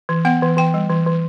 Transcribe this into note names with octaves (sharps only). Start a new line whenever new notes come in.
E3
B3 F#5
E3
E3 G5
G3
E3
E3